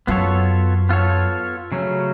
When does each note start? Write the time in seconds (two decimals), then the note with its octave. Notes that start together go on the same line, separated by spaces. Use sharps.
0.07 F#2 B3 F4 A4 C#5
0.89 B3 F4 A4 C#5
1.72 C#3 F#3 A3 C#4